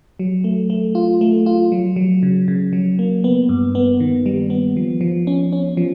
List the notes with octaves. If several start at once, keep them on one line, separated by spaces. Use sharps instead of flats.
F#3
A3
A3
F4
A3
F4
F#3
F#3
C#3
C#3
F#3
A#3
B3
G2
B3
D#3
G3
B3
F3
F3
C#4
C#4
F3